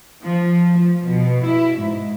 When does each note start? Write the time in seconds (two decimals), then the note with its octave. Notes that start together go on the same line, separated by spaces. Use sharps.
0.23 F3
0.73 F3
1.10 B2
1.46 E4
1.81 G#2